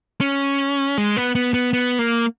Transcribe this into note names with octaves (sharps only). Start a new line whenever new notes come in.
C#4
G#3
B3
B3
B3
B3
A#3